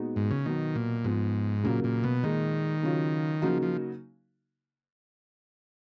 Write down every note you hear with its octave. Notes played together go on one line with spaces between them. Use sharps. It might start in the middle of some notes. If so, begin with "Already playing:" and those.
Already playing: A#2 G#3 B3 D#4 F#4
G#2
C#3
B2 D#3 F#3 B3
A#2
G#2 F3 G#3 B3
A#2 C#3 F#3 A#3 F4
A#2
B2
A#2 D#3 G#3 D#4
C#3 F#3 C#4 F4
C#3 F3 F#3 A#3 D#4 F#4
F3